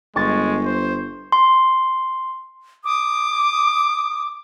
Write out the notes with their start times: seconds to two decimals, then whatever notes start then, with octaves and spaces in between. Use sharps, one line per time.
0.16 G1 G#3 C#6 A6
0.64 C5
1.32 C6
2.84 D6 D#6